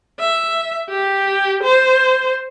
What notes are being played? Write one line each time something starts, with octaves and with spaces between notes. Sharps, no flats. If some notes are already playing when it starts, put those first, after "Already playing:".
E5
G4
C5